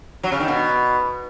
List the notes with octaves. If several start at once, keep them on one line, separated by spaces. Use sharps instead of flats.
F#3
C#3
D#3
B2